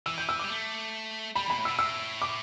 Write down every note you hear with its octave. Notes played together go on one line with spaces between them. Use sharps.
E3 E6
G6
E6
G3 D6
A3
G3 B5
E3
B2 B5
A2
B2 E6
A2 E6
D6